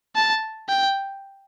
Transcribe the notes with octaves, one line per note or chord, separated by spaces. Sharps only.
A5
G5